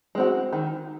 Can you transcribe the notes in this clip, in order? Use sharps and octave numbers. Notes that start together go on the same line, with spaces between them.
G#3 C4 F#4
D#3